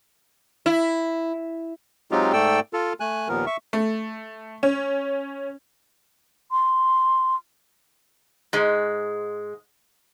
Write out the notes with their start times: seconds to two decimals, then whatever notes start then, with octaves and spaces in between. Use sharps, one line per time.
0.66 E4
2.11 F#3 G#3 C4 D#4 F4 G4
2.33 G#2 A3 A4 D5 G5 E6
2.73 F4 A4
3.00 A3 G#5 F#6
3.28 D#2 A#2 F3 B3 A#4
3.46 E5 C#6
3.73 A3
4.63 C#4
6.52 C6
8.53 G#2 G#3